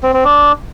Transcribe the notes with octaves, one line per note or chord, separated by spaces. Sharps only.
C4
C4
D4